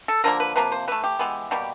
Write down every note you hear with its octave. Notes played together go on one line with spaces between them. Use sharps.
A4
D3 F3 A#3 A#4
B4
C3 F3 A#3 B4
C5
E3 A3 B4
G4
E3 G#3 B3
B2 G3 A#3 G4